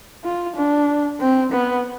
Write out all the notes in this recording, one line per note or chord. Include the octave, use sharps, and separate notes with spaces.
F4
D4
C4
B3